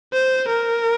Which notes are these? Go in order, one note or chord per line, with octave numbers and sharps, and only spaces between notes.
C5
A#4